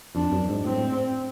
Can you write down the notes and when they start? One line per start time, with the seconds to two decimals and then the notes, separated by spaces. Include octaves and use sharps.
0.15 F2 D4
0.32 F#2
0.49 G#2
0.65 A2 C4